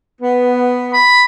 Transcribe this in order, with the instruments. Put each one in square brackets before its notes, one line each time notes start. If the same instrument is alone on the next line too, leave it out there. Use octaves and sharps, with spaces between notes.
[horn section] B3
[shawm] B5